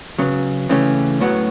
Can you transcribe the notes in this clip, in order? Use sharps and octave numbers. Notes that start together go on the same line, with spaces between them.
C#3 F#3 B3
C#3 E3 A3 C#4 G4
A2 F#3 B3 F#4